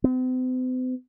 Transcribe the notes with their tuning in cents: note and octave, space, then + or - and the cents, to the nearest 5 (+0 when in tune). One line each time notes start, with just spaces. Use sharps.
C4 -45